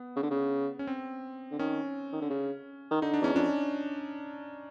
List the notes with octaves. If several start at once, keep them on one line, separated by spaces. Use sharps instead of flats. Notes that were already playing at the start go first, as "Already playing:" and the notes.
Already playing: B3
C#3
D3
C#3
C#4
C4
D3
D#3 C#4
D#3
D3
C#3
D#3
D3 D#4
D4
E2 C#4
F2 D4